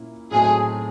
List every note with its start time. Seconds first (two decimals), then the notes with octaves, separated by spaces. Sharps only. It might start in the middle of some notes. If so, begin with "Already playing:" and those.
Already playing: A#2 A#3 C#4 E4
0.31 A2 F#3 A3 C4 D#4 G#4